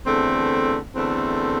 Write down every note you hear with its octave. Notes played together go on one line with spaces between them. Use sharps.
E2 D3 A3 C4
E2 D3 A3 C4